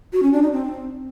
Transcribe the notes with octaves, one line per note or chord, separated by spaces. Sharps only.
F#4
C#4
D4
D#4
C4